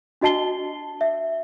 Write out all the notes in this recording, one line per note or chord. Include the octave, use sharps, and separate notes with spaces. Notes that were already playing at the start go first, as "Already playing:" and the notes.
D4 F#4 D#5 A5 C7 G7
E5